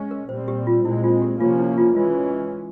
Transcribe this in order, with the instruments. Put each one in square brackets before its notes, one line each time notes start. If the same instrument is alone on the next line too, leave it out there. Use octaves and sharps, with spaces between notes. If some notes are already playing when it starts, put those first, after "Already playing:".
Already playing: [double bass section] G#3 C#4
[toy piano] A#4
[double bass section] A#2 G3 C4 [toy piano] C5
[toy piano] G4
F4
[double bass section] A#2 G#3 C4 [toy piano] E4
[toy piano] F4
G4
[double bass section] C3 F3 A#3 C#4 [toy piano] F4
[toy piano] E4
F4
[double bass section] E3 G#3 C#4 [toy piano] F4